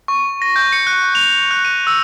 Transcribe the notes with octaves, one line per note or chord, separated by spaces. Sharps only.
C#6
A#6
G6
C#7
F#6
F7
F#6
D#7
E6